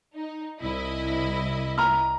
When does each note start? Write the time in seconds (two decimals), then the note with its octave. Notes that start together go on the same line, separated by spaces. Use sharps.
0.15 D#4
0.62 C2 E4 D#5
1.78 A#5 F6